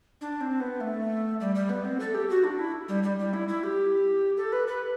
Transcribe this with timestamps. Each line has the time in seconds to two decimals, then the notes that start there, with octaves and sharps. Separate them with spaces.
0.21 D4
0.41 C4
0.60 B3
0.81 A3
1.40 G3
1.55 G3
1.69 B3
1.84 C4
2.00 A4
2.14 G4
2.30 F#4
2.44 D4
2.59 E4
2.88 G3
3.03 G3
3.19 G3
3.34 E4
3.48 E4
3.63 G4
4.37 A4
4.52 B4
4.67 B4